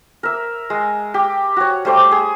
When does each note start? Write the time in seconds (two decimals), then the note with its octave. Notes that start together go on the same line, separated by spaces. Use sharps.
0.23 A#4 E5
0.70 G#3
1.14 G4
1.56 F#4 C#5
1.85 G3 A3 C5 D6
2.11 G#4